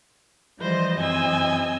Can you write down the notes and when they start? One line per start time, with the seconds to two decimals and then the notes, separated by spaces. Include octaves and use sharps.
0.59 E3 F3 G3 C5 D#5
0.99 F#2 E3 C4 D#5 G#5 E6